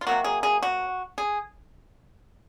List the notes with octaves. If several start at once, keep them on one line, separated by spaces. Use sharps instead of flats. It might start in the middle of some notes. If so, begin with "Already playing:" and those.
F4
C3 F#3 A#3 F#4
G#4
G#4
F#4
G#4